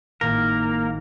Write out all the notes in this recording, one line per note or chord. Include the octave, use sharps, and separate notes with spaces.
G#1 A2 A#3 A#4